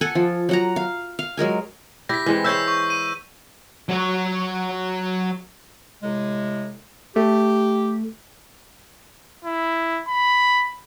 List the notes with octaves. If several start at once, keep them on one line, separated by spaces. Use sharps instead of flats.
A4 F#5 G#5
F3
F#3 F#5 A#5
F5
F5
F#3 G#3 A#4 G#5
E4 G4 A#6 B6
E3 G#3 C4
C5 C#5 E5 E6 G6 B6
C#6
D#7
F#3 C#5
A2 C3 G#3
A3 G4
E4
B5